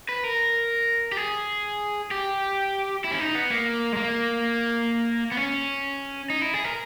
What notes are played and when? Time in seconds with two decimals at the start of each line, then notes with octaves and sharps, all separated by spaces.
0.09 B4
0.24 A#4
1.12 G4
1.17 G#4
2.11 G4
3.04 E4
3.11 C#4
3.19 D#4
3.35 B3
3.51 A#3
3.93 G#3
3.97 A#3
5.32 B3
5.37 C#4
6.30 D#4
6.41 E4
6.54 G#4
6.64 A#4